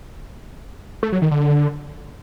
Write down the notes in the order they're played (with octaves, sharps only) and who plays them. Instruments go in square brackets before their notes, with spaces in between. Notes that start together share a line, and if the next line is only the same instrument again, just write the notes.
[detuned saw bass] A3
F#3
D#3
D3